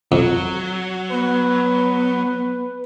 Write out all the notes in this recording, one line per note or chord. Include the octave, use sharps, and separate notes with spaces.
F2 F#3
B3 B4